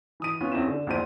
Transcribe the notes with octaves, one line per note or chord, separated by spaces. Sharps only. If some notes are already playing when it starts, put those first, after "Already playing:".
E3 D#6 D#7
B3 C#4 F4
E2 C4 C#4 E4 E7
D3
A#1 E2 A#2 C5 D#7